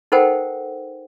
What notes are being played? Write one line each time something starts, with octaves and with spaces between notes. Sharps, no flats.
D#4 A4 A#4 C5 F#5 G5